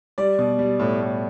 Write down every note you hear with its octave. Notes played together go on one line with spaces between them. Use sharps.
G3 D5
B2
G3
A2
A2